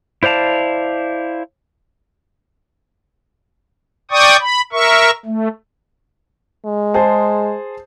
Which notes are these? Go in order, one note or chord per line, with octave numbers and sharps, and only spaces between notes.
E4 C5 D5 F5 A5
D5 G5 C#6 D#6
B5
A#4 E5 C#6
A3
G#3
G#4 C5 A5